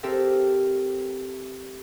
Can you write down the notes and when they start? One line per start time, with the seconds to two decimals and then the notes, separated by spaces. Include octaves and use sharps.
0.03 C4 G4 A4 A#4 E5